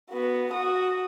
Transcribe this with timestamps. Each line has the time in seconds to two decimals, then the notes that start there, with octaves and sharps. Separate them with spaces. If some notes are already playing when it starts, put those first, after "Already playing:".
0.10 B3 F#4
0.52 F#4 D#6